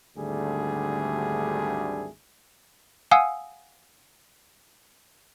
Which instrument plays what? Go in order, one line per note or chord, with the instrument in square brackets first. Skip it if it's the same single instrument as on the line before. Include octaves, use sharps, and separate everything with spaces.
[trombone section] G#1 D2 D3 G3 A3 G#4
[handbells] F5 F#5 G#5 D#6 E6